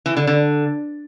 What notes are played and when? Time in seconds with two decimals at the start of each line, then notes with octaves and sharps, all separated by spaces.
0.06 E3
0.17 D3
0.27 D3